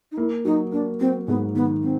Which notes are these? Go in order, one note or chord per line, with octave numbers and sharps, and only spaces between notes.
D#4
A#3 E4
F#3 D#4
A#3 D4
F#3 C4
G#2 B3
D#3 B3
C4